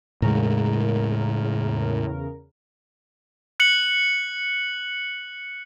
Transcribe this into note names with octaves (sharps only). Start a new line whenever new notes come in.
E2 A2 C#3 G#3 A#4
F#6 C#7 F#7